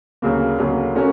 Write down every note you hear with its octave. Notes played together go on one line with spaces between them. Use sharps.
D2 C#3 F#3 A#3
D2 C#3 F#3 A#3
A3 C#4 F#4 A#4